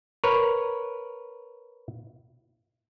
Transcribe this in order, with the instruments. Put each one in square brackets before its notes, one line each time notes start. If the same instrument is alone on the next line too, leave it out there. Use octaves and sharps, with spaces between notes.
[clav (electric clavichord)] A#4 B4 C#5